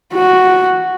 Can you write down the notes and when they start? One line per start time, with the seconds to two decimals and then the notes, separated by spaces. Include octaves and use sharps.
0.14 F#4